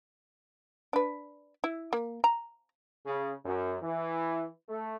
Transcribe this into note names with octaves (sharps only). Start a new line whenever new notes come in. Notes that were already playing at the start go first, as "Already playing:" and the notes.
D4 B4
E4
A#3
A#5
C#3
F#2
E3
A3